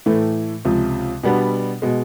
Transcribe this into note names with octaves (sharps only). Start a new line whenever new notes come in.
A2 E3 A3
C#2 C3 F3
B2 G3 B3 D4
B2 G#3